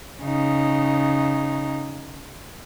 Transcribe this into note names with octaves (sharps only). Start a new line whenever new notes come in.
C#3 D#4